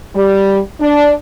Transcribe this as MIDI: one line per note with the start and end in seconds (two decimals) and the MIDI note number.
0.14 0.58 55
0.80 1.12 62